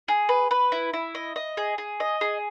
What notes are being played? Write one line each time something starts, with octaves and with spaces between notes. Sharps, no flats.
G#4
B4
B4
E4
E4
D#5
D#5
G#4
G#4
D#5
G#4